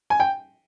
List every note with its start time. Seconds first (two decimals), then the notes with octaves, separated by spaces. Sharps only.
0.10 G#5
0.20 G5